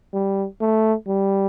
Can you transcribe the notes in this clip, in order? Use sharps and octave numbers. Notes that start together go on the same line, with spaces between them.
G3
A3
G3